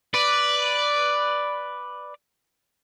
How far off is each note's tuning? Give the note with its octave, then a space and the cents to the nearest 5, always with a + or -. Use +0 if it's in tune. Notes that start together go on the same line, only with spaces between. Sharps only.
B4 +0 D5 +0